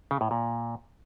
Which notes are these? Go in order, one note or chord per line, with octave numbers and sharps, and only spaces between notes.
C#3
A2
A#2